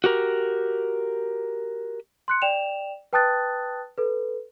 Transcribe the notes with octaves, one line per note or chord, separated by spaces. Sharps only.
F#4 G4 A#4
C6 F#6 C#7
D5 G5 E7 F7
B4 G5 A5 D#6 F#6 A6
A4 B4